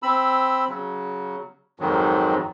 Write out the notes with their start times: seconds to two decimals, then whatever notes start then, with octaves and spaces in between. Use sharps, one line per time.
0.03 C4 B5 E6
0.68 C#3 F#3
1.80 F2 G#2 D#3 F#3